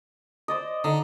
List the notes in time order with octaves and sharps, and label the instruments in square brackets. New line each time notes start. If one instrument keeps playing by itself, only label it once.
[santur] C5 D5 D#5
[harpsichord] D3 [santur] D#4